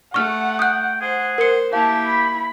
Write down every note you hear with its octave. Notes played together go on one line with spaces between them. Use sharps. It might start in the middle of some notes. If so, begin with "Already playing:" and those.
A3 F#5 C#6 F6
G5 D#6 F#6
G#4 C5 F#5
A#4 C5 C#7
A#3 E4 G4 F5 A5
B5